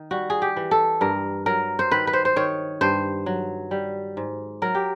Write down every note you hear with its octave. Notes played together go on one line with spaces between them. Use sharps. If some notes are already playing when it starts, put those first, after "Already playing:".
Already playing: D#3
G3 F#4
G#4
G4
E3
A4
G2 A#4
F#3 A#4
C5
D#3 B4
B4
C5
C5
D#3 C#5
G2 C5
F#3
G3
G#2
F#3 A#4
G4